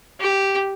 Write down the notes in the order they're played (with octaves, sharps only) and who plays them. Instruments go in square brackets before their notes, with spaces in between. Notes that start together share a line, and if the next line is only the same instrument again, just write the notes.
[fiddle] G4